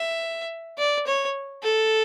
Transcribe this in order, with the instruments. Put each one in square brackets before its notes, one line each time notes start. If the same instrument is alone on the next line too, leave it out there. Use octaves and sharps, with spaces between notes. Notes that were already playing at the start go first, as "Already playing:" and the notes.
Already playing: [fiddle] E5
D5
C#5
A4